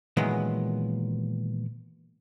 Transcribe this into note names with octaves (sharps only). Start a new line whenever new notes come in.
A#2 D#3 E3 F#3 G#3 B3